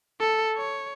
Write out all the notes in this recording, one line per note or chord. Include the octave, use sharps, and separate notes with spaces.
A4
C#5